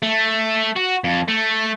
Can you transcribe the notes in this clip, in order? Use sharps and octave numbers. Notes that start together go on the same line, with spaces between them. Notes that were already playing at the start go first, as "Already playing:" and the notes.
A3
F#4
F2
A3